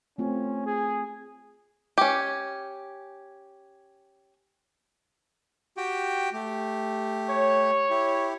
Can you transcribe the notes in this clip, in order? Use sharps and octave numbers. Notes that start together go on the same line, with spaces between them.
A3 C4 C#4 F4
G#4
C#4 G4
F#4 G4 G5
A3 G4
C#5
E4 G4